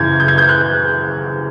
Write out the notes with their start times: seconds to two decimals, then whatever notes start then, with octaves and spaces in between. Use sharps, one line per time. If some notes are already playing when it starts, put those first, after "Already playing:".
Already playing: F#2 C#3 E3 G6 G#6
0.20 G6
0.28 G#6
0.38 G6
0.49 F#6